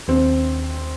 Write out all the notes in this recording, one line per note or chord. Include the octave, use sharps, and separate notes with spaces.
D#2 C4